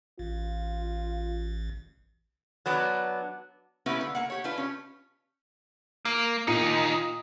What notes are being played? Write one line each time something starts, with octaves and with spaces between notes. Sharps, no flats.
A1 F4
F#3 B3 D4
A#3 B3 C#4 E4 G4 B4
D3
A#3 F#5
G4 C#5
D4 F4 B4
C#4 G4
A#3 D7
D#2 A#2 D#4 D#6 C#7